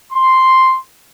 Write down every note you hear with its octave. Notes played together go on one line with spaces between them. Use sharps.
C6